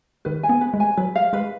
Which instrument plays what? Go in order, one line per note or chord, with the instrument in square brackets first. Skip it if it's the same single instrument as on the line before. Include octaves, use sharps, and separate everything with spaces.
[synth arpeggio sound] D#3 [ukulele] B4
[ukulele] G#5
[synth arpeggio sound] B3
[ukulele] B4
[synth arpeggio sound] G#3
[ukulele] G#5
[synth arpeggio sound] F#3 [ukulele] B4
[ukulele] F5
[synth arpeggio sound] G#3 [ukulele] B4